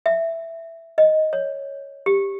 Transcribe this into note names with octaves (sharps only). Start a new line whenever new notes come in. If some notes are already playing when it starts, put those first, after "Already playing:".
E5
D#5
C#5
G4